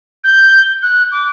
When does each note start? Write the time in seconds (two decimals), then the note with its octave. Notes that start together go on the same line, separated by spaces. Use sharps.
0.24 G6
0.83 F#6
1.12 D6